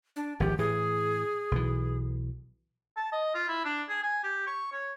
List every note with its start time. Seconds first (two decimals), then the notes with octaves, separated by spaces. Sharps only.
0.16 D4
0.40 G#1 D2 F3 G4
0.59 A2 E3 G#4
1.51 B1 E3
2.97 A5
3.12 D#5
3.35 F4
3.48 E4
3.65 D4
3.89 G#4
4.03 G#5
4.24 G4
4.47 C#6
4.72 C#5